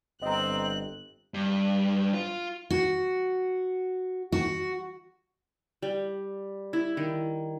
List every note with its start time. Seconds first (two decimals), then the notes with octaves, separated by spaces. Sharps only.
0.22 G1 C4 D#5 A#5 F#6
1.34 G2
2.14 F4
2.70 F#4
4.32 F#4
5.82 G3
6.73 E4
6.97 D#3